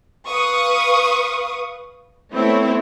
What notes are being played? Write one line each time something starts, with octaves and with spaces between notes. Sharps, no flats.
B4 F5 C#6 D#6
A3 B3 C4 E4 C5 C#5